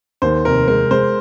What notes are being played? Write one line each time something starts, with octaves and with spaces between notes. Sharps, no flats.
D#2 C5
F1 A#4
G#3 A#4
G#3 C5